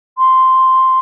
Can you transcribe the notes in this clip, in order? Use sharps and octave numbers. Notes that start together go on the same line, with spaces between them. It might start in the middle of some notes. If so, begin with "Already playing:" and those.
C6